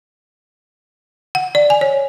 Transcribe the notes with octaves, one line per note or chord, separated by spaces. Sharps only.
F#5
D5
G#5
C#5